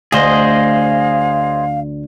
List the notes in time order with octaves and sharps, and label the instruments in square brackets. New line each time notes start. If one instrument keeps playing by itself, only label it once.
[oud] D2 [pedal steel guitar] G#4 C5 D#5 [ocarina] F5